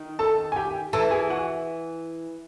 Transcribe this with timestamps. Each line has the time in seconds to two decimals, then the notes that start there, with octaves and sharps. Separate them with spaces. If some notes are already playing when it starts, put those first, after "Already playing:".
Already playing: D#3
0.19 A4 A5
0.52 G#5
0.56 G4 G5
0.93 E3 A4 A5
1.11 G#4 G#5
1.30 F#4 F#5